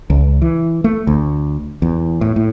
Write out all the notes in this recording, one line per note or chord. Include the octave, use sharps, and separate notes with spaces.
C#2
E3
A3
D2
E2
A2
A2